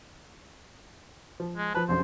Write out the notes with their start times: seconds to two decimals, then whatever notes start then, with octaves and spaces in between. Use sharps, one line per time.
1.40 F3
1.57 G#3
1.74 F3 B4 A5
1.88 F1 A#1 F#2 C5